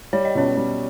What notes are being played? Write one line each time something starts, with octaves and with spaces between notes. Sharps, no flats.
G3 C#5
D#5
B2 C#4 C#5
G3